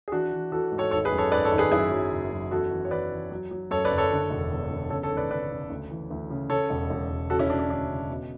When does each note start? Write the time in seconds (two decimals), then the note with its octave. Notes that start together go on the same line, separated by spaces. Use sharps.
0.08 G#4
0.12 E3 D4 F#4
0.32 E3
0.52 E3 F#4 A4
0.72 G#2
0.78 A4 C#5
0.91 G#1 A4 C#5
1.05 G#4 B4
1.12 F#2
1.18 A4 C#5
1.32 G#1 B4 D5
1.45 A4 C#5
1.52 G#1
1.58 G#4 B4
1.72 F#2 E4 G#4
1.92 F#3
2.12 F#1
2.32 F#2
2.51 E2 F#4 A4
2.71 E3
2.85 C#5
2.91 E3 B4 D5
3.12 E3
3.31 F#3
3.51 F#3
3.70 F#2 A4 C#5
3.85 B4 D5
3.91 F#1
3.98 A4 C#5
4.11 D3
4.31 E1
4.51 E2
4.71 D3
4.90 C#3 A4 C#5
5.03 A4 C#5
5.11 G#1
5.17 B4 D5
5.31 C#3 B4 D5
5.51 C#3
5.70 D2
5.90 E3
6.11 D2
6.30 C#3
6.50 C#3 A4 C#5
6.70 E1
6.90 E1
7.10 E1
7.30 C#3 F#4 A4
7.39 C#4 E4
7.49 C#3 D4
7.59 D4
7.70 D2 D4
7.89 C#3
8.09 B2